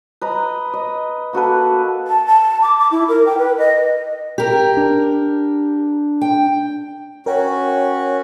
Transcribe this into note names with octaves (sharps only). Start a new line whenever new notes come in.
B4 D#5 A#5
D#5
A#3 F#4 A4 B4
A5
A5
D6
D6
E4
A#4
G5
B4
D#5
G4 A#4
D4
G5
C#4 F#4 A#4 C#5 G5